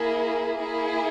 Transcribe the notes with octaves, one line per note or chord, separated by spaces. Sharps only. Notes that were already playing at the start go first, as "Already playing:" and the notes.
Already playing: A#3 E4 G#4
A#3 E4 G#4